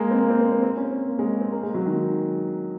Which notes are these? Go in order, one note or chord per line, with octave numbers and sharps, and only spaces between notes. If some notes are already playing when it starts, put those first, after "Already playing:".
Already playing: G#3 A#3
C4
A#3
C4
C4
C4
C4
C#4
C4
A#3
G#3
C4
A#3
G#3
F#3
D#3